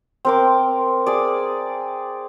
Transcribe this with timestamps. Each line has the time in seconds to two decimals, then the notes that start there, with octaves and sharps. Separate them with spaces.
0.25 C4 A#4 D6
1.06 G#4 D5